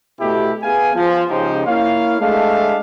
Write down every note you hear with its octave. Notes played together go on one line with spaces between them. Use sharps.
B2 A3 E4 G4
B3 G#4 F5 G#5
F3
C#2 C#3 F3 D#4 G4 C5
A#3 E4 C#5 F5
G#3 A3 D4 E5 F5